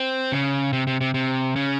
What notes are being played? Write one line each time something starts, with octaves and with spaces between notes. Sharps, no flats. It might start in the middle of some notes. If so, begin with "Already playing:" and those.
Already playing: C4
C#3
C3
C3
C3
C3
C#3